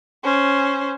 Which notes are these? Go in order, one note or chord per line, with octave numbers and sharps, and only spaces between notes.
C#4 C5